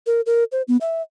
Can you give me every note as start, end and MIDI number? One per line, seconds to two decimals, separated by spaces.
0.07 0.21 70
0.26 0.44 70
0.52 0.62 72
0.68 0.77 59
0.81 1.02 76